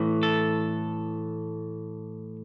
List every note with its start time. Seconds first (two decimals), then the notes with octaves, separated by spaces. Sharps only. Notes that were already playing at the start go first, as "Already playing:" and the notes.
Already playing: A2 E3
0.23 A4